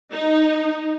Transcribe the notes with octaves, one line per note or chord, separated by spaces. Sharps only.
D#4